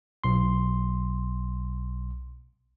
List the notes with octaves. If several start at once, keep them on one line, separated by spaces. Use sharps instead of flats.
B1 C6